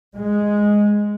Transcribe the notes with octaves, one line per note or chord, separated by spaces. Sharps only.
G#3